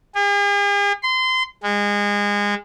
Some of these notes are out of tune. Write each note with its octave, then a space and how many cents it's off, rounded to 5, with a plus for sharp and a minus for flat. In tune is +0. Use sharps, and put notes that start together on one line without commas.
G#4 -45
C6 -25
G#3 -25